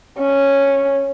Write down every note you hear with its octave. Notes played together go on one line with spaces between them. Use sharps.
C#4